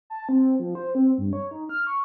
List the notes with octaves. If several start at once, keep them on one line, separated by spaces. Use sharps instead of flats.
A5
C4
F3
C5
C4
G2
C#5
D#4
F6
C#6